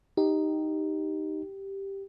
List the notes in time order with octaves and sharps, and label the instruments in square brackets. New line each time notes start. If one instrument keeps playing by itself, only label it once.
[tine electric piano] D#4 [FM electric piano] G4